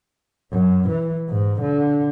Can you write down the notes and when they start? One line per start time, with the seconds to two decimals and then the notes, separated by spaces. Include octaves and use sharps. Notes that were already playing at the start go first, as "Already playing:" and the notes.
0.52 F#2
0.89 E3
1.29 G#2
1.61 D3